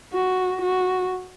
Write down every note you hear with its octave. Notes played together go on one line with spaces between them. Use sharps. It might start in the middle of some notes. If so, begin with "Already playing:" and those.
F#4
F#4